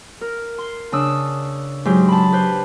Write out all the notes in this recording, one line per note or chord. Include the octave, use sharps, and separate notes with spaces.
A#4
C6
C#3 D4 D#6 E6
G#2 F#3 G4
A5 B5
G4 B4 C5